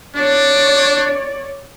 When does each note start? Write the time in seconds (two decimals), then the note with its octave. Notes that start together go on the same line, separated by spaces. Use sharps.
0.15 D4 C#5 D5